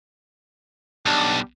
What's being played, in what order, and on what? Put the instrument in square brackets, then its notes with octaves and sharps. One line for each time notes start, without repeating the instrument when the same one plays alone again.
[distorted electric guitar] B1 [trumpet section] G3 D4 A5